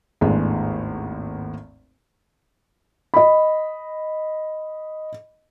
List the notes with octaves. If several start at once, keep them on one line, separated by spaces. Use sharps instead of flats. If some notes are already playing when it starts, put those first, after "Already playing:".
G#1 D#2 A2 G#3 B3 D4
D#5 B5